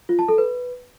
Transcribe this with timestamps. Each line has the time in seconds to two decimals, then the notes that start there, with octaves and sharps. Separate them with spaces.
0.09 F4
0.19 A5
0.28 A4
0.38 B4